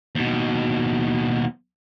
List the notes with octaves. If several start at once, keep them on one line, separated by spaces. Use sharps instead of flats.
D#2 B2